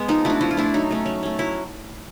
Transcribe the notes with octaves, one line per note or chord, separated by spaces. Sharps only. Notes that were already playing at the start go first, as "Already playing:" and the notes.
Already playing: G#3 B3
F3 D#4
A3 D4 E4 F#4
F3 E4
F4
A3 D4 E4
F#3 D#4
A3 C#4
F#3
A3 C#4
F#3 E4